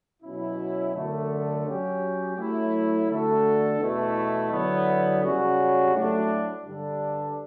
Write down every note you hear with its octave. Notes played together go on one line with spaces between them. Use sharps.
B2 F#3 C#4 E4
F#2 D3 A3
F#3 C#4 G4
F#3 A3 E4
D3 A3 D4 F#4 A4
E2 B2 A3 E4
D3 F#3 B3 E4
C#3 G3 C#4 F#4
A2 F#3 A3 D4 F#4
G2 D3 G3 D4 A4